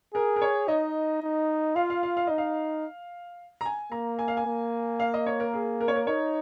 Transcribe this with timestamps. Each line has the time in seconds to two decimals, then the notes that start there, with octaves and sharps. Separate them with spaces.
0.14 G#4 A#4
0.36 A#4
0.42 C#5
0.68 D#4 D#5
1.23 D#4
1.76 F4 F5
1.90 F5
2.03 F5
2.17 F5
2.27 D#4 D#5
2.38 F5
3.61 A#5
3.65 G#5
3.92 A#3 A#5
4.19 G#5
4.28 F5
4.37 G#5
4.46 A#3
5.00 F5
5.14 D#5
5.26 C#5
5.40 A#4
5.53 G#4
5.81 A#4
5.88 C#5
5.96 A#4
6.07 D#4 C#5